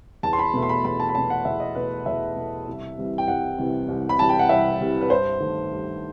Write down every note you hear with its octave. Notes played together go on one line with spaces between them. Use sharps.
E2 A5
C6
B5
B2 A3
C6
B5
E2 B5
A5
B5
B2 A3 A5
F#5
E2 E5
D#5
B2 A3 B4
E2 E5
B2 A3
C2
C3 E3 G3
G5
C2 F#5
C3 E3 G3
C2
B5
C3 E3 G3 A5
G5
F#5
C2 E5
C3 E3 G3
B4
G2 C5
D#3 A3
G2